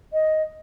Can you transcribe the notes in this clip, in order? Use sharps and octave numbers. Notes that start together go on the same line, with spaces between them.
D#5